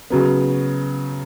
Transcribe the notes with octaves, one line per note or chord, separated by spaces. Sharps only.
C#3 F#3 B3